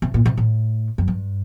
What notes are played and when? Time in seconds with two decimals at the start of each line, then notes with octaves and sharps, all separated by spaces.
0.02 C3
0.14 A#2
0.26 C3
0.37 A2
0.98 F#2
1.08 G2